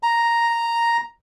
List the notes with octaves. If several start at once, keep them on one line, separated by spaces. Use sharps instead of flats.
A#5